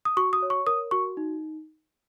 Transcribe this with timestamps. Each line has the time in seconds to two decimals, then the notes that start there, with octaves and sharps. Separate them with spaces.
0.05 D#6
0.17 F#4 C#6
0.33 D#6
0.42 C#5
0.50 C#6
0.67 A#4 D#6
0.91 F#4 C#6
1.17 D#4